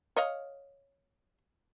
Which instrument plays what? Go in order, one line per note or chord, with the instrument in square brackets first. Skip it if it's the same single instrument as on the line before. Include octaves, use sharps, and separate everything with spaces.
[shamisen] C#5 D#5 F5